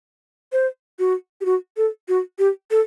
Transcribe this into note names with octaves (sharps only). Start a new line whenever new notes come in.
C5
F#4
G4
F#4
A4
F#4
G4
A4